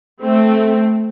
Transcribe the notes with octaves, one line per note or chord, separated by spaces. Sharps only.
A3 C4